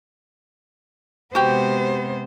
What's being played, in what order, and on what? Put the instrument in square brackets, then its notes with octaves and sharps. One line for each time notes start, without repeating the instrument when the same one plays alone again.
[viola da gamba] C3 G#3 B3 [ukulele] F#4 G4 [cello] C5